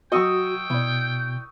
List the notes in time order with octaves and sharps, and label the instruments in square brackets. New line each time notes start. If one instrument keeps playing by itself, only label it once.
[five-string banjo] F#3 D#5 [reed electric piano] F#4 [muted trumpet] G5 [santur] C#6 D#6 E6
[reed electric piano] B2 [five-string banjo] E4 D5